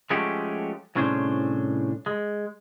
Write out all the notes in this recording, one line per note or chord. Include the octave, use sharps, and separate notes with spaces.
F3 G#3 A3 C#4 F#4 G4
C2 A2 C#4 D4 G#4 C5
G#3